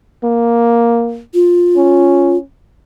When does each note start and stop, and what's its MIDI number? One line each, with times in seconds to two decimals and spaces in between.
0.24 1.21 58
1.34 2.37 65
1.77 2.42 61